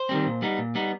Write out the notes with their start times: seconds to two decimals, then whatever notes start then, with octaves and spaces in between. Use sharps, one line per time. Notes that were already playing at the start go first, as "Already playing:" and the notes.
Already playing: C5
0.09 D#3 G3 C4
0.26 A#2
0.42 G3 B3 D#4
0.58 A#2
0.75 G3 B3 D#4